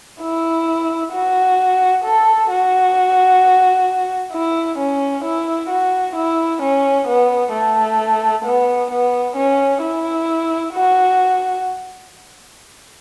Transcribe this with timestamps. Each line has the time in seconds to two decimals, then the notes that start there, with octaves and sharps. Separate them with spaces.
0.21 E4
1.13 F#4
2.04 A4
2.50 F#4
4.33 E4
4.79 C#4
5.24 E4
5.70 F#4
6.16 E4
6.62 C#4
7.08 B3
7.53 A3
8.45 B3
8.91 B3
9.36 C#4
9.82 E4
10.74 F#4